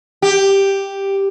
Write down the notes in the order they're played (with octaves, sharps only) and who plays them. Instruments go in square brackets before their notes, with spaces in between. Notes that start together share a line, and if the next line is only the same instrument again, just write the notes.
[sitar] G4